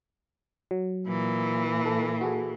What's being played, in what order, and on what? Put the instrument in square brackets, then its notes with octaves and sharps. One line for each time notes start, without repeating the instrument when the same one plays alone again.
[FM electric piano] F#3
[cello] A#2 E3
[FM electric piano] A4
F#4 G#4 A4